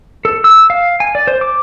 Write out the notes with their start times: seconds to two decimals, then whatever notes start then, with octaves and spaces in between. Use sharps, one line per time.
0.25 A4
0.44 E6
0.70 F5
1.00 G#5
1.15 D5
1.27 C5
1.41 D6